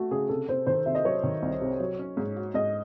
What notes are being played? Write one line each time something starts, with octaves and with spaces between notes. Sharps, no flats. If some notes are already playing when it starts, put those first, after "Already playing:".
Already playing: A3 F#4 A4
C#3 G#4
C3 A4
C3 C5
D#3 C5
C3 E5
D#5
F#3 C#5
D#3
C2
C3
F#3
C#4
G#2
F#4
G#2 D#5